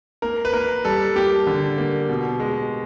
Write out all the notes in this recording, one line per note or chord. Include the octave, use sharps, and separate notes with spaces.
A#3 A#4
B4
A#3 A#4
G3 A4
A#3 G4
D3
A#3
B2
G#3